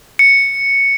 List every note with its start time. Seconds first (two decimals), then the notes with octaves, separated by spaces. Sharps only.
0.19 C#7